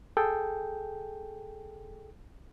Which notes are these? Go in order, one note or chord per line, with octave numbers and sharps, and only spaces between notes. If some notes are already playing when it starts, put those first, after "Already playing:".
G#4 A4 G5